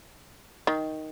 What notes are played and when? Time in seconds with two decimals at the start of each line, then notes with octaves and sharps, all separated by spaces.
0.67 D#3